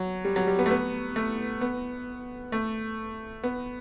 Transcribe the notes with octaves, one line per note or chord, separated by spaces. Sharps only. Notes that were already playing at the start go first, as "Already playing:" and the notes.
Already playing: F#3
G3
F#3
G3
B3
A3
B3
A3
B3
A3
B3